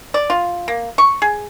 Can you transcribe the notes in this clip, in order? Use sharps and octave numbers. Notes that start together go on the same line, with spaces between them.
D5
F4
A#3
C#6
G#4